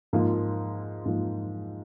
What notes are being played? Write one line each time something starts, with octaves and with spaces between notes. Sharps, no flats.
G#2 F3 A#3 F4
G#2 F3 A#3 F4